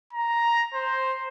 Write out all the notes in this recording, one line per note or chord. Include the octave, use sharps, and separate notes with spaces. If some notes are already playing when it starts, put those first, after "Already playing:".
A#5
C5